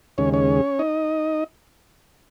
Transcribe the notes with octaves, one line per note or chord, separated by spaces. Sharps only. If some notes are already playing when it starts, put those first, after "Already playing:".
D#2 C#3 G#3 C#4 C#5
C#4 C#5
D#4 D#5